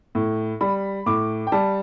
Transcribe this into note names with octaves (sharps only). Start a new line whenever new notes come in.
A2
G3 B5
A2 D6
G5
G3 A5